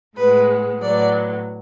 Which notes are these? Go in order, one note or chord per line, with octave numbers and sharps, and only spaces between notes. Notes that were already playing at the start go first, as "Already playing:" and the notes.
A2 G#3 B3 B4
A2 F#3 B3 D5